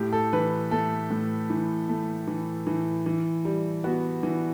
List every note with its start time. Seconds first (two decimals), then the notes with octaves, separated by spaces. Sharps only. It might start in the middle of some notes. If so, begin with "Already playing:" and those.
Already playing: A2 G4
0.12 A4
0.33 E3 B4
0.71 A3 A4
1.11 A2
1.50 E3
1.89 A3
2.27 E3
2.67 E3
3.06 E3
3.45 G3
3.84 B3 F#4
4.23 E3